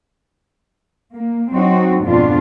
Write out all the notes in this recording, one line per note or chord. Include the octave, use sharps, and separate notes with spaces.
A#3
F#3 C4 D#4 F#4
F2 G#2 B2 D4 F4